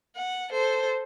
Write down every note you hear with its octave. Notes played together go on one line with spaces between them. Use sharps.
F#5
A4 C5